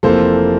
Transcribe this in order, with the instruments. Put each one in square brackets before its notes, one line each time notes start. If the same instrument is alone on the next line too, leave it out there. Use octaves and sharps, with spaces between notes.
[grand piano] F1 F2 E3 A#3 A4 C5